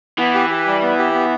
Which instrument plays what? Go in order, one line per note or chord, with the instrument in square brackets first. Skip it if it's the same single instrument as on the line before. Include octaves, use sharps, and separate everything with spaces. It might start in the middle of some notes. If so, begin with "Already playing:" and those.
[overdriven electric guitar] E3 [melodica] B3
[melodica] G4
G4
G3
B3
G4
B3